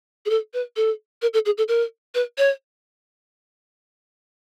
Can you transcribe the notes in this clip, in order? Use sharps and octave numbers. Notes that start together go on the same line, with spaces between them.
G#4
A4
B4
A4
A#4
A4
G#4
A4
A#4
B4
C#5